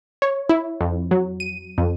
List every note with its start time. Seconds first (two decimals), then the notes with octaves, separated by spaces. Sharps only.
0.22 C#5
0.49 E4
0.81 F2
1.11 F#3
1.40 D#7
1.78 F2